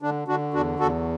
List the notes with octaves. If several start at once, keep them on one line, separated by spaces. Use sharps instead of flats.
D3 D4
D3 D4 F#4
E2 D4 F#4
E2 F#4 A4